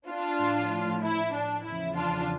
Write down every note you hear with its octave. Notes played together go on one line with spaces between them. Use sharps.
D4 F4
A2 F3
E4
D4
E2 C#3 F3 E4
D4 F4